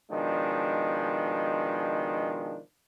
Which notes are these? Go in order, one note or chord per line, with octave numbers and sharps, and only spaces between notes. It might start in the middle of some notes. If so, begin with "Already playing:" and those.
B2 D#3 F3 G#3 D4